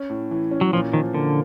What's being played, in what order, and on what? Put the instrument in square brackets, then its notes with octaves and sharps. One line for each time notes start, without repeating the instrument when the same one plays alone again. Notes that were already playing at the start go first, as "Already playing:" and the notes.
Already playing: [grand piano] C#4
A2
E3
C#4
[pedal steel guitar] F#3
[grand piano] A#2 [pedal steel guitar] F3
[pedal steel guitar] D#3 [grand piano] F3
[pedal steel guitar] D3 [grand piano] A#3